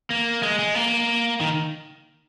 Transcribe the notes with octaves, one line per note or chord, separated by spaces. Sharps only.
A#3
G#3
G#3
A#3
D#3